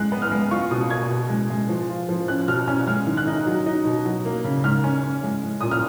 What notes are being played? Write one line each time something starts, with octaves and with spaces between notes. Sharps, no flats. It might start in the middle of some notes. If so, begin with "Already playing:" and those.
Already playing: G#3 F#6
B3
F6
G#3
F4 C#6
B2 D#6
A#3 G#6
B2
G#3
G#3
F3
F4
F3
C#4 F#6
B2 F6
C#4 F6
G#3 F6
D#3
F#6
D#4
F#3
D#4
B2
F#3
A#3
C#3
G#2 F6
C#4
C#4
G#3
G#3
A#2 D#6
F6